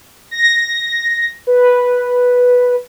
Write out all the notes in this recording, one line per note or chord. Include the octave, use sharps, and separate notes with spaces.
A#6
B4